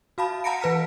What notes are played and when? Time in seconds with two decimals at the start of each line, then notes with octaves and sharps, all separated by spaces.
0.18 F#4 F5 A5 B5
0.44 F#5 A5 A#5 A#6 C#7 D7
0.61 E3 B4 F6 B6